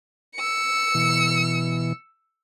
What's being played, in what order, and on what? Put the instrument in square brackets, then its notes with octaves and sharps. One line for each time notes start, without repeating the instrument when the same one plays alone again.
[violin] E6 C#7
[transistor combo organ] B2 E3